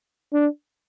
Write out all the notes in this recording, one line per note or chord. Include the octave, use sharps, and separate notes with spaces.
D4